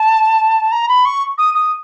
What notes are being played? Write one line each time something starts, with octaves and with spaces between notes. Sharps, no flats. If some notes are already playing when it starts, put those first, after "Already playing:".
Already playing: A5
A#5
B5
C#6
D#6
D#6